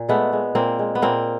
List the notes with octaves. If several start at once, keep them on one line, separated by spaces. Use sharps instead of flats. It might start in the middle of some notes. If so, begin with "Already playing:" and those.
Already playing: A#2
G#3 A3 B3
G#3
A#2 A#3 C4
G#3
B3
A#2 A#3 C4